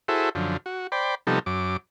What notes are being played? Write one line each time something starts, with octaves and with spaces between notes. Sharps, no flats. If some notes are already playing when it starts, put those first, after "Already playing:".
E4 F#4 G#4 A4 C5 E5
F#2 D3 F3
F#4
C5 D5 G5 B5
C3 F3 G3 B3 D#4 A4
F#2 D6